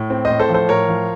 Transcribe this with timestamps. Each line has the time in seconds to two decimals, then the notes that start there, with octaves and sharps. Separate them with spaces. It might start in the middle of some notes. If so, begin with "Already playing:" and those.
Already playing: A2
0.10 C4
0.25 C5 D#5
0.30 A2
0.39 A4 C5
0.49 F3
0.54 A4 C5
0.69 A2 A#4 C#5
0.89 F3